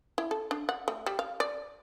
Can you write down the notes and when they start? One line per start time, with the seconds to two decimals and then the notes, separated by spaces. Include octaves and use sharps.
0.18 E4
0.31 A4
0.51 D4
0.69 F#5
0.88 A3
1.06 G3
1.19 F5
1.40 D5